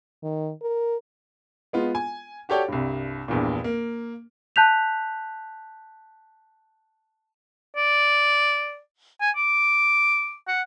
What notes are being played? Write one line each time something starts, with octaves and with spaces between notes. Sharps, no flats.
D#3
A#4
G#3 B3 F4
G#5
F#4 G4 A4 C#5 D5 G5
C2 G2
A#1 E2 G2 A#2
A#3
A5 F#6 G6 B6 F7
D5
G#5
D6
F#5